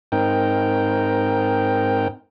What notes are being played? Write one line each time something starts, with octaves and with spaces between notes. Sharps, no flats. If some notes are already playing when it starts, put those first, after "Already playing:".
G#2 C4 D#4 A#4 G5